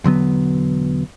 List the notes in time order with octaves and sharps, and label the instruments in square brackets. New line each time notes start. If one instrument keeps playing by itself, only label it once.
[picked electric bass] E1 D3 F#3 B3